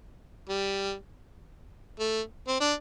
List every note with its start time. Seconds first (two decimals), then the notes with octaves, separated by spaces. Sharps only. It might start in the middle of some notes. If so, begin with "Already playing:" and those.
0.49 G3
1.99 A3
2.47 C4
2.60 D4